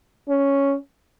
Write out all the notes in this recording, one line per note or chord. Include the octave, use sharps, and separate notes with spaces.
C#4